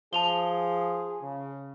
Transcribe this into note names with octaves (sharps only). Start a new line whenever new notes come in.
F3 G#4 A5 F7 G7
C#3